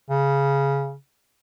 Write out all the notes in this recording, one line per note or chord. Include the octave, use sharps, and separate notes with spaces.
C#3